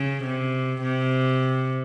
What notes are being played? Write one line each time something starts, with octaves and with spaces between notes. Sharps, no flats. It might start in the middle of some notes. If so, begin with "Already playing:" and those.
Already playing: C#3
C3
C3